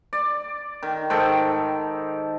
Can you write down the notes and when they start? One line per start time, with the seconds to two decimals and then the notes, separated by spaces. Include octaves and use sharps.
0.13 D5
0.83 D#3
1.10 G#2 D#3 A4 G5